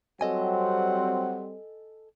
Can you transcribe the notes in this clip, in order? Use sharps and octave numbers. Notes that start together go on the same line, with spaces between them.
F#3 G3 C4 A4 D#5 F#5 G#5